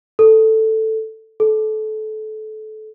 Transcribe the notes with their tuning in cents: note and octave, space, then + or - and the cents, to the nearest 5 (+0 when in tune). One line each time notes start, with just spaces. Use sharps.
A4 +5
A4 -25